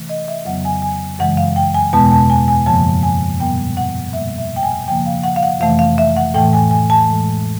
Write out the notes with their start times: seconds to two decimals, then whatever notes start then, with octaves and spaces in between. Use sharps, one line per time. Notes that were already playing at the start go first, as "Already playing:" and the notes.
Already playing: C3 E3 A3
0.09 D#5
0.28 E5
0.45 F2 C#3 F#3 B3 F#5
0.65 G#5
0.82 G#5
1.19 F#2 C#3 E3 G#3 F#5
1.37 F5
1.56 G5
1.74 G#5
1.93 E2 B2 G#3 B3 A5
2.12 A5
2.30 G#5
2.48 G#5
2.66 F#2 C#3 F3 A#3 A5
3.03 G#5
3.40 A#2 G3 B3 G5
3.77 F#5
4.13 B2 G3 A#3 E5
4.38 E5
4.56 G5
4.63 G#5
4.88 C#3 F3 A#3 G5
5.06 F5
5.24 F#5
5.36 F5
5.43 F#5
5.60 F2 C3 E3 A3 F5
5.79 F5
5.98 E5
6.16 F#5
6.34 A2 E3 A3 G5
6.53 G#5
6.71 G#5
6.90 A5
7.08 A2 E3 G#3